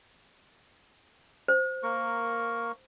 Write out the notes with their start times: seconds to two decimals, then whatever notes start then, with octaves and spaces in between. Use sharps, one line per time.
1.48 C5
1.83 A#3 A#4 C#6